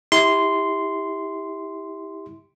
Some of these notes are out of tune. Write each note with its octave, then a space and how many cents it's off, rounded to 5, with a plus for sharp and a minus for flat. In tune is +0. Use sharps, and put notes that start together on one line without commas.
E4 -25 G4 +15 C6 -10